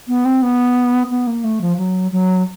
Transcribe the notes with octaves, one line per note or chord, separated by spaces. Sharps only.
B3
C4
B3
B3
A#3
A3
F3
F#3
F#3